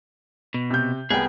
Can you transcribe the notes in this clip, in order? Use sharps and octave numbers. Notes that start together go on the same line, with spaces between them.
B2
C3 G6
C2 B3 G#4 G5